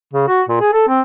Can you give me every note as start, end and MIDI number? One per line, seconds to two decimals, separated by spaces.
0.13 0.27 49
0.28 0.43 66
0.49 0.59 46
0.61 0.73 68
0.73 0.86 69
0.88 1.01 60